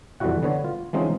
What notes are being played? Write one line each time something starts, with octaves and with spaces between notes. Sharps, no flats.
F2 E3 G3 E4 F#4 F#5
D3 B3 C#5
F4
E3 F3 G#3 C4 C#4 D#4